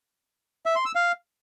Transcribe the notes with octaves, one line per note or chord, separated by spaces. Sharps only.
E5
C6
E6
F5